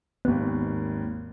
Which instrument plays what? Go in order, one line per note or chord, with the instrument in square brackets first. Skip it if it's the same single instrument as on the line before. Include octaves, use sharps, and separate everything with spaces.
[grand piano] G#1 D#2 [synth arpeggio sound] B3